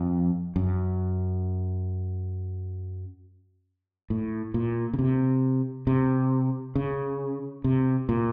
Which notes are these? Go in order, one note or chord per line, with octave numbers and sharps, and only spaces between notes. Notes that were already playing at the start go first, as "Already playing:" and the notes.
Already playing: F2
F#2
A2
A#2
C#3
C3
C3
C#3
C3
A#2